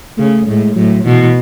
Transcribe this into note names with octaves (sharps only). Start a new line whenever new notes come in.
C#3 A3
A2 G#3
A2 F#3
B2 E3